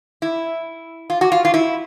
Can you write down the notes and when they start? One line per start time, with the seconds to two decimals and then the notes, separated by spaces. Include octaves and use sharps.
0.22 E4
1.10 F4
1.21 F#4
1.32 F4
1.45 F4
1.54 E4